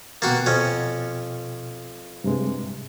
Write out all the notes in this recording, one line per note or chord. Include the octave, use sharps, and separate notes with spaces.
B2 A#3 F#4 G5 A6
F2 C#4
G2 C3 G#3